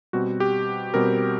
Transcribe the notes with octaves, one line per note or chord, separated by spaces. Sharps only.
B2 G3 C4 F#4
G4
B2 G3 C4 A#4